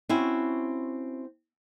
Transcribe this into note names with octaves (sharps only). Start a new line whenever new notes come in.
C4 C#4 E4 F#4